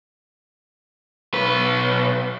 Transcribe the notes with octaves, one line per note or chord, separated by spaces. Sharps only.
B1 B4